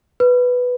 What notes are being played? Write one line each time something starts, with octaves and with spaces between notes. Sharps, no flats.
B4